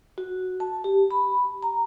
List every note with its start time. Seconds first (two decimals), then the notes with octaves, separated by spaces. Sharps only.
0.18 F#4
0.60 A5
0.84 G4
1.11 B5
1.63 A#5